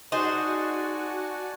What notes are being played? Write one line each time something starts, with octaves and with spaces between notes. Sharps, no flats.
D#4 F#4 G#4 C5 D5 G#5 A5